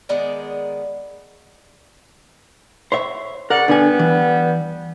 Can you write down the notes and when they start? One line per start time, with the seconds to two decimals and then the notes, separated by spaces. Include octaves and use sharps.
0.09 D#3 G#3 B3 D5
2.92 C5 C#5 E5
3.50 C#3 A#4 D5 F#5
3.68 D3 G3 B3 D4 G#5
3.99 E3